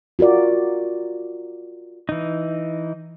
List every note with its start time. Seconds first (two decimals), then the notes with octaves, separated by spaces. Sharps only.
0.19 F4 F#4 A#4 D5
2.09 E3 D#4